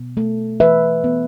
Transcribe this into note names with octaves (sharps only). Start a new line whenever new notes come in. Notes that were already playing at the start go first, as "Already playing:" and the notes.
Already playing: B2 B3
A3
E3 B4 E5
B3